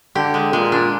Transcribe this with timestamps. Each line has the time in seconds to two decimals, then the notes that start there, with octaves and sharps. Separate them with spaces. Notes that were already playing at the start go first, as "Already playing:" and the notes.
0.15 D3 G4
0.34 G#3
0.53 A#2 G#3
0.72 D4